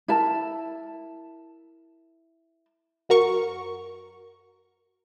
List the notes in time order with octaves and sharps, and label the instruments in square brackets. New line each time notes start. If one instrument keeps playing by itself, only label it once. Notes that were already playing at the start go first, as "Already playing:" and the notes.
[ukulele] E4 A#4 A5
[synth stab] F#2 F#4 A#4 C#6